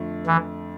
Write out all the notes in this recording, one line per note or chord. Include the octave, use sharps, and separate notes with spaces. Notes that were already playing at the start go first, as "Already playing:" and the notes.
Already playing: F2 D3 A3
E3